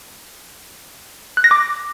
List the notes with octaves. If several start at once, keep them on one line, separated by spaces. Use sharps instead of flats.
F#6
A#6
D6